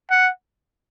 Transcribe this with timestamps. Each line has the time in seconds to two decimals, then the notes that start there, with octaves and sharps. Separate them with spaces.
0.10 F#5